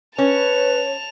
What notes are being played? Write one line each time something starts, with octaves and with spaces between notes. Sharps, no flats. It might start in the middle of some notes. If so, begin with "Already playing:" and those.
C#4 B4 C#5 A5 F7